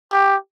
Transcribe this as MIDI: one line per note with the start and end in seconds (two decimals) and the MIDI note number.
0.13 0.36 67